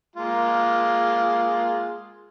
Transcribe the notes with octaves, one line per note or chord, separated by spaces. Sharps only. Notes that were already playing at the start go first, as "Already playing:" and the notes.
G#3 A#3 F4